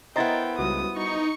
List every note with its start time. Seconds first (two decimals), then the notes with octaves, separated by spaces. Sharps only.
0.16 B3 E4 A#4 C5 D#5 G5 A#5 A6
0.58 C#2 G3 F#4 D#6
0.96 D#4 C#6 C#7